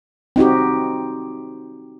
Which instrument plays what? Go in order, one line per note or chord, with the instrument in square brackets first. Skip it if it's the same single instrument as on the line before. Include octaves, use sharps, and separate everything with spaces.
[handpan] C4 D#4 F#4 G4